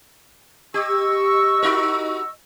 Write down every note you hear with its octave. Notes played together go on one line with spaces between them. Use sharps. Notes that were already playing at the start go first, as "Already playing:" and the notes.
G4 D#5 C#6 E6
D#4 F#4 A#4